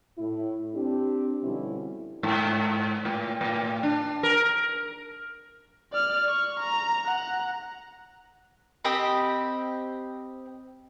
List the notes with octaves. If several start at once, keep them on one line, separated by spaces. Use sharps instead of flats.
A2 E4
C4 D4 G4
B2 D3 F3 G3 C#4 E4
G#2
A2
A2
D4
A#4
D5 F6
C#6
A#5
F#5 A#5
C4 G4 D#5 B5